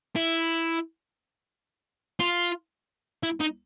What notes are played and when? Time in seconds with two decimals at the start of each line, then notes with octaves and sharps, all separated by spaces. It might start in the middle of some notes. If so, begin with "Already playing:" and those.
0.16 E4
2.20 F4
3.23 E4
3.40 D#4